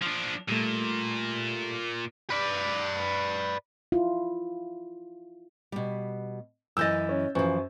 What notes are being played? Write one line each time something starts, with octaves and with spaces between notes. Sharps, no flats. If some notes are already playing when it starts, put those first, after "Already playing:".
F3 D4
A#2 G3 A3
B4 D5
E4 F4
B2 G3
F#2 E3 D#5 E6 G6 A6
C#4
F#2 E3 F3 C5 C#6